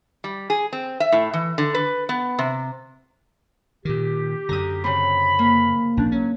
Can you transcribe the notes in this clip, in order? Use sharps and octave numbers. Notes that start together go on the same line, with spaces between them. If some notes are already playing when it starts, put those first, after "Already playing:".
G3
G#4
C4
E5
A2
E3
D3
B4
B3
C3
A#2 D#3 G4
F#2 D3 A#5 D#6
C#3 C4 B5
A#3
A#1 C#4 D4
F#3 C#4